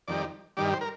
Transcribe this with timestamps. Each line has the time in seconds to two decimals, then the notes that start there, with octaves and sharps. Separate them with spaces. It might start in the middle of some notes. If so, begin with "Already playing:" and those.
0.08 F2 D#3 G3 D5
0.57 G2 D#3 G3 D5
0.73 C5
0.81 A#4